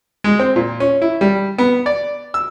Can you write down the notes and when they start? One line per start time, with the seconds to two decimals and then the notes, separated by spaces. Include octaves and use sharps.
0.24 G#3
0.39 C4
0.56 A#2
0.80 C#4
1.02 E4
1.21 G3
1.59 B3
1.86 D5
2.34 E6